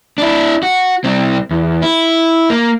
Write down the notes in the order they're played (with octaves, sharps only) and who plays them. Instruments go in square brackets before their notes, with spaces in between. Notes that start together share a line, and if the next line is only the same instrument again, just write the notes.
[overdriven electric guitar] D4 E4
F#4
C2 C4
E2
E4
A#3